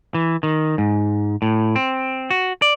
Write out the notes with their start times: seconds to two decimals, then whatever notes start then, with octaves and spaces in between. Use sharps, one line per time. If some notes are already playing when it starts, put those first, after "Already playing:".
0.14 E3
0.43 D#3
0.78 G#2
1.42 A2
1.76 C4
2.31 F#4
2.62 D5